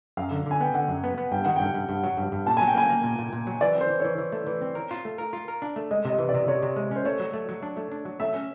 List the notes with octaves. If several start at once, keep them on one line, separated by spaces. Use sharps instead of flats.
F#2 F5
D3
D3 G#5
B3 G5
D3 F#5
F#2
B3
B3
G2 G5
D#3 F#5
G2 G5
G2
G2
F#3
G2
G2
A#2 A5
F#3 G#5
G5
A#3 G#5
A#3
A#2
A#2
A#2
F#3
E3 D5
C4
C5
E3
C#5
E3
E3
A3
E3
C4
A#4
F4
A3
A#4
F4
A#4
D4
A3
G#3 D#5
C3 D#5
E3
D5
C3
C3 C#5
C3
G#3
C#4 C5
A3 C#5
F#3
A3
F#3
D4
A3
D4
F#3
A3 E5
C#4